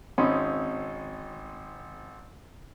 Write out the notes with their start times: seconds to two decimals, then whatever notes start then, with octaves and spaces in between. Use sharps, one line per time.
0.18 G#1 C4 C#4 D#4 C5 B5